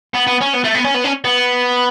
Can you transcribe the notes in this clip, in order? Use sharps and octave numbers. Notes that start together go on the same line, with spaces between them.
B3
B3
C#4
B3
A3
B3
C#4
B3
C#4
B3